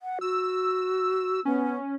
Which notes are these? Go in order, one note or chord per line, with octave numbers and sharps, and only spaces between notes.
F#5
F#4 E6
B3 C#4